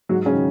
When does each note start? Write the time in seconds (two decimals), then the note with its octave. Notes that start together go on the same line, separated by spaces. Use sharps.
0.09 G#2 F#3 F#4
0.26 C#3 C#4
0.35 D#3